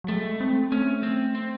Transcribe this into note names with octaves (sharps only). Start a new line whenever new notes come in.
F#3
G#3 A3
C4
A3 C#4
C4
C4